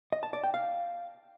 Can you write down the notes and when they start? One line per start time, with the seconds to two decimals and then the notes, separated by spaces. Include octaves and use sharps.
0.12 D#5
0.23 A5
0.33 D5
0.44 G5
0.54 F5